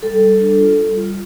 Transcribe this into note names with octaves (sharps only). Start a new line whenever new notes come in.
G3 A4
G3
D4
F4
G3
F4